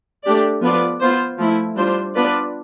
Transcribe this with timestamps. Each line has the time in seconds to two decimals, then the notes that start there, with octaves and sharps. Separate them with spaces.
0.24 A3 D4 G4 D5
0.62 F3 B3 F4 B4 D5
1.00 B3 F4 C5
1.38 F3 A3 E4
1.76 G3 D4 F4 C5
2.14 B3 D4 F4 B4 D5